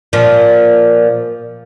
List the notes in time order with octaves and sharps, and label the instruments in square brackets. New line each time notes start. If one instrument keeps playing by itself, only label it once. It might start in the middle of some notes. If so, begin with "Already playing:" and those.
[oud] A#2 F3